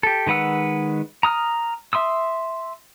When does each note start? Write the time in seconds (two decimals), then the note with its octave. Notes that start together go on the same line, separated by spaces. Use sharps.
0.03 G4 A4
0.27 D#3 G#3 B4 F#5 E6
1.23 A#5 D#6 F6
1.93 E5 C6 D#6 E6